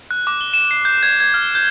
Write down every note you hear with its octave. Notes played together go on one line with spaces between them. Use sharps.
F#6
D6
G7
E7
C7
G6
G#6
G#6
F6
G6